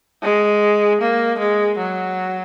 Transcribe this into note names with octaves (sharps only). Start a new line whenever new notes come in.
G#3
A#3
G#3
F#3